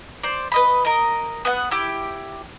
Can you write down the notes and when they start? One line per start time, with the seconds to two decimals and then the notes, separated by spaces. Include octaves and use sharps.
0.23 C5 D5
0.52 B4 D#5 B5
0.85 A#4 D#5
1.45 B3 F#5
1.71 E4 G4